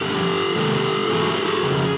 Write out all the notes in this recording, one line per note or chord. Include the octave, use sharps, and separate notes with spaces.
G2 D3 F3 G4 A4
C3 D#3 G#3 G4 A4
G#2 E3 A3 F#4 G#4
G4 A4
F#4 G#4
F2 C#3 G#4